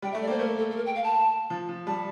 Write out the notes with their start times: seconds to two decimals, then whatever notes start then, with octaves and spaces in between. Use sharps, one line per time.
0.02 G3 G5
0.11 E5
0.15 A3
0.21 D5
0.27 A#3
0.30 C5
0.39 A3 A#4
0.58 A4
0.71 A4
0.76 A#4
0.86 G5
0.95 F5
1.04 A5
1.50 F3
1.69 F3
1.87 G3 A5